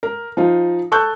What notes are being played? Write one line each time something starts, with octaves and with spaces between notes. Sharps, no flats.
A#4
F3 D#4 F4
A4 A5 C#6 E6 F#6 G6